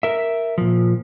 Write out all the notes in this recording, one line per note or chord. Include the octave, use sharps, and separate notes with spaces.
A#4 E5
A#2 F3